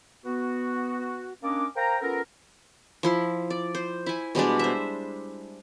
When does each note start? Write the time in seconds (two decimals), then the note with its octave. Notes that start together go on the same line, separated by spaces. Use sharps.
0.25 B3 F#4
1.43 A#3 C#4 D4 A#4 D#5 D6
1.76 A#4 C5 F5 G5 A#5
2.01 B3 C#4 F4 A4 A#4
3.03 F3 E4 C6
3.50 D5
3.75 C5
4.06 E4 G#5
4.35 B2 G3 G#3 D4
4.59 C5 E5